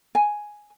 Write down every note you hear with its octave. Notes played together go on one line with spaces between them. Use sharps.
G#5